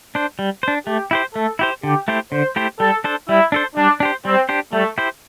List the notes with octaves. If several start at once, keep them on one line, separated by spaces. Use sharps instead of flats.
D4 C5
G3
D4 C5
A3 G4
E4 G4 C5
A3 A4
E4 G4 C5
D3 G4
A3 E4 G4 C5
D3 C5
A3 E4 G4 C5
G3 A4
D4 A4 C5
G3 E4
D4 A4 C5
G3 D4
D4 G4 C5
G3 C4
D4 G4 C5
G3 A3
E4 G4 C5